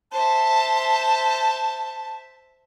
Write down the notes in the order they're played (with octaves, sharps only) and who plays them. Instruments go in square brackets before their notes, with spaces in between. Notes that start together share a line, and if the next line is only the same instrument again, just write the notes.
[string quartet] C5 E5 [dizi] A5